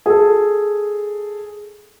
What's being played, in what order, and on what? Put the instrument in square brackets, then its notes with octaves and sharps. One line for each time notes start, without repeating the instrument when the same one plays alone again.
[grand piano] G#4 A4